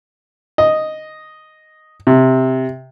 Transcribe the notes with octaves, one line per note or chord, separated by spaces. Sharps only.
D#5
C3